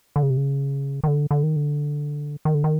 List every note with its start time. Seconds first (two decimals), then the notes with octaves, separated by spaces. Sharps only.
0.16 D3
0.23 C#3
0.30 C3
0.37 C#3
1.04 D#3
1.08 D3
1.31 D3
1.43 D#3
1.56 D3
2.45 D#3
2.55 D3
2.64 D#3